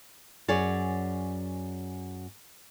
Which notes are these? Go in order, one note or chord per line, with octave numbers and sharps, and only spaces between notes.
F#2 G#4 C#5 D5